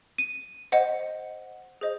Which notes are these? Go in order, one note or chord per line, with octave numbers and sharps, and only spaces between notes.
D#7
C5 D#5 F#5
G#4 C5 D#5